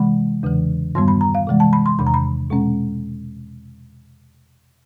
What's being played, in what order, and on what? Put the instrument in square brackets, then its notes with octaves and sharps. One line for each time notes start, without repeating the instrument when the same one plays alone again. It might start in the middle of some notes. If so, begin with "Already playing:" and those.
Already playing: [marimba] C3 E3 G#3 B5
E2 C#3 E3
G2 D#3 G3 B3 C6
B5
A#5
F5
C3 E3 G#3
A5
B5
C6
E2 C3 D#3 B5
A#5
B5
B2 G#3 C#4